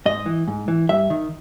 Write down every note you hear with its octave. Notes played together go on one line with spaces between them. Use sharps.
G#2 D#5
E3
G#2
E3
G2 E5
D#3